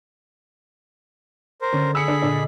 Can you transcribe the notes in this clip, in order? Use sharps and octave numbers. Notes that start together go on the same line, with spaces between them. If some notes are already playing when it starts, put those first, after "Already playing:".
A#4 C5
D3 C#4 F#5 A6
G#4 B5 E6 C#7
D4
A#2 D4 D#5